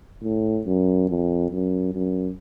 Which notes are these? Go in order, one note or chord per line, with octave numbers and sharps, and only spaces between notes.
A2
F#2
F2
F#2
F#2